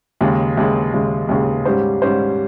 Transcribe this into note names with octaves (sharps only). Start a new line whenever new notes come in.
D#2 C#3 G#3
D#2 C#3 G#3
D#2 C#3 G#3
D#2 C#3 G#3
G#2 G3 C#4 G4 C5
G#2 G3 C#4 G4 C5